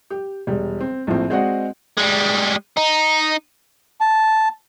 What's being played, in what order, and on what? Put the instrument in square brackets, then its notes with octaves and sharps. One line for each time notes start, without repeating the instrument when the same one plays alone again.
[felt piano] G4
E1 G3
C4
A#1 A2 F3 C4
G#3 C4 F#4 D5 D#5 F#5
[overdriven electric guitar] G3 G#3
D#4
[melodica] A5